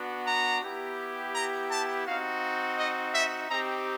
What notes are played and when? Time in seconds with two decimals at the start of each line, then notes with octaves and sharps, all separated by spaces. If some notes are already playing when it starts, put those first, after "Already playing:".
Already playing: B3 D4 F#4
0.27 A#5
0.62 B3 E4 G4
1.35 A#5
1.70 A5
2.06 C4 D#4 F#4 F5
2.78 D#5
3.15 E5
3.50 C4 D#4 G4 A#5